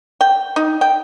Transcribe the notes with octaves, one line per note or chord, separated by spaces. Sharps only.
G5
D#4
G5